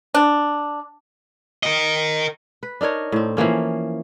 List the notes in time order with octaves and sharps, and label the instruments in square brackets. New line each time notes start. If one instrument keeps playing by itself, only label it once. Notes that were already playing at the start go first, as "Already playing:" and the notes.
[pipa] D4
[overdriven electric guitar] A#4 D#5
[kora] B4
D4 D#4 A#4 C#5
A2 C4
E3 F3 A#3 C#4